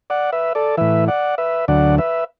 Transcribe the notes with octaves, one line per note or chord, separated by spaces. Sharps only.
D5 F#5
B4 E5
A4 D5
A2 E3 B4 E5
D5 F#5
B4 E5
D2 D3 F#3 D5 F#5
B4 E5